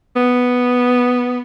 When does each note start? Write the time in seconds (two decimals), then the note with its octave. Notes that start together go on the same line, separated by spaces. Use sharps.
0.16 B3